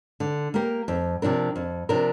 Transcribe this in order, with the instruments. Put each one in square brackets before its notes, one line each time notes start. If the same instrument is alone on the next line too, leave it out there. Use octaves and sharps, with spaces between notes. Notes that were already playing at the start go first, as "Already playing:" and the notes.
[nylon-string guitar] D3
A#3 G4 A#4
F2
C3 F3 D4 A#4
F2
C3 F3 D4 A#4